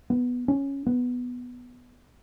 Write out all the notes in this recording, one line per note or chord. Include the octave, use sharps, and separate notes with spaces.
B3
C#4
B3